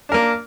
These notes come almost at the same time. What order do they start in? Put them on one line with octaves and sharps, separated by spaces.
D4 A#4 A#3